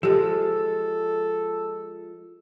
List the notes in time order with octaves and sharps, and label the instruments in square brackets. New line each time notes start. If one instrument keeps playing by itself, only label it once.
[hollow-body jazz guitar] F3 G#3 [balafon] G4 [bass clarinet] A4